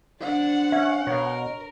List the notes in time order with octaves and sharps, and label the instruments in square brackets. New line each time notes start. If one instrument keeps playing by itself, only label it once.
[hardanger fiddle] D4 C5 [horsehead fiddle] F#5
[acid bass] C#4 [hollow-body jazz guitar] E5
[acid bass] B2 [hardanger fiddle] A#4 [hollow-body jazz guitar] C#5